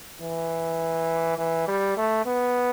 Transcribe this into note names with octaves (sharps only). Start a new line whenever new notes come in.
E3
E3
G3
A3
B3